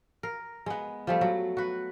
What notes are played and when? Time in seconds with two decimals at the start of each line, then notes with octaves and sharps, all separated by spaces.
0.23 A#4
0.66 G#3 B3
1.07 F3 G3 A3
1.21 F#3
1.57 F#4 B4